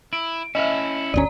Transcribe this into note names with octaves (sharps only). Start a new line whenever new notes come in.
E4 D7
C#4 E4 D#5 E5
G1 D2 C#4 D5 A#5